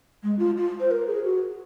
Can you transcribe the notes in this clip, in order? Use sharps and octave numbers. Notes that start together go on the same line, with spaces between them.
G#3
F4
F4
C5
A#4
G#4
F#4